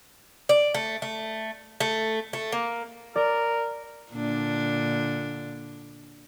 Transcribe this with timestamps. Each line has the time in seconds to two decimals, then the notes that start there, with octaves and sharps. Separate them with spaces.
0.49 D5
0.74 A3
1.02 A3
1.80 A3
2.33 A3
2.52 A#3
3.16 A#4 D5
4.12 A#2 D3 D4